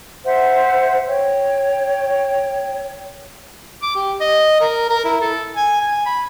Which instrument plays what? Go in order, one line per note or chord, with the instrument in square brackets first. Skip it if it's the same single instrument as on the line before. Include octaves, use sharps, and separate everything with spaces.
[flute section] C5 E5 F#5
C#5 G5
[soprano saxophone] D6
G4
D#5
A#4
A#4
E4
A4
G#5
G#5
B5